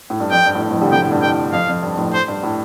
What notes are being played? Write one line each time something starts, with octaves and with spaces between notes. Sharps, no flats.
A2
G2
F2 G5
G2
A2
G2
F2 A2
D3 G3
C3 F3 G5
A2 D3
G2
F2 A2 G5
F2 F5
F2
G2
F2 A2
C5
G2
A2